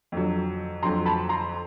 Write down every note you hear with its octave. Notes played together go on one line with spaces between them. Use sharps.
F2 D3 F#3
F2 D3 F#3 A#5 C6
A5 B5
A#5 C6